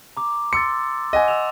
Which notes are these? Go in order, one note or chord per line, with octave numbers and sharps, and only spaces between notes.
A#5 D6
C6 E6 A6 C#7
D#5 F#5 G#5
E6 E7 F7